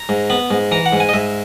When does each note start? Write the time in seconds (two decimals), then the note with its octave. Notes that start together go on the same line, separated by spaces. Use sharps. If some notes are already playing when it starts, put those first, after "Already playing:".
Already playing: A#5
0.09 G#2
0.30 B3 B5
0.51 G#2
0.72 E3 A#5
0.86 F#5
0.93 G#2
1.00 G#5
1.09 D#5
1.14 G#2 E5